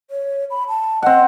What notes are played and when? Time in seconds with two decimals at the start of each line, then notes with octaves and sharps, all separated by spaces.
0.10 C#5
0.50 B5
0.68 A5
1.02 C4 D#5 F#5